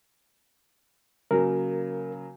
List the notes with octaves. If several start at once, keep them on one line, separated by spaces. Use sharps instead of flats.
C#3 F#3 A#3 A#4